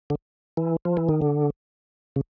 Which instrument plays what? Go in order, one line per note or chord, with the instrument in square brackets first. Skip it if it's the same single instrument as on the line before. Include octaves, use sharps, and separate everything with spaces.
[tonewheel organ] D3
E3
F3
E3
D#3
D3
C#3